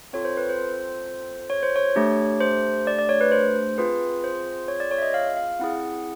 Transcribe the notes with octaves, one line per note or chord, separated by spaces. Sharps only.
C4 F4 A4 C#5
C5
B4
C5
C#5
C5
C#5
A3 D4 G4
C5
D5
D5
C#5
B4
C5
C4 F4 G#4 B4
C5
C#5
D5
C#5
E5
D#5
F5
F5
C4 E4 G#4 F#5